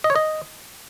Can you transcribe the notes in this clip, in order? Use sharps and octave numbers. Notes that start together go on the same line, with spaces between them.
D#5
C#5
D#5